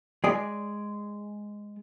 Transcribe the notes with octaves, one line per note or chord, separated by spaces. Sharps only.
G#3 G#4 D5